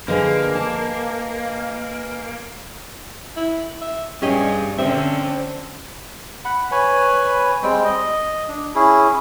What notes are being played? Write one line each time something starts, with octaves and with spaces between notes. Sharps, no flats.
D3 F3 A#3 G#4 B4 D#5 G#5
A5
E4
E5
G2 C#4 G4 G#4 D#5
D3 C4 C#4 E5
F#5 B5
B4 C#5 G#5 B5
G3 G#3 C4 G5
D#5
D4
C#4 E4 G#4